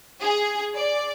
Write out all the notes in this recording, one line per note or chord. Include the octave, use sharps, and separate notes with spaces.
G#4
D5